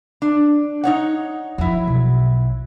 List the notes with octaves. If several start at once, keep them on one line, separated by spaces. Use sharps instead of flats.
D4
D#4 C#5 F#5
F2 F#3 E4
B1